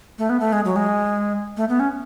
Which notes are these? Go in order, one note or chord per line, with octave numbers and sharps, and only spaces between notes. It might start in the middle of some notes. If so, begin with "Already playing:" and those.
A3
B3
A3
G#3
F#3
G#3
A3
B3
C#4